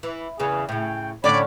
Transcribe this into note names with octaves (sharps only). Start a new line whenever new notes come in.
E3
E2 C#3 E3 G#4
A2 C#3 G5
A2 D3 C#4 D4 C#5 D5 B5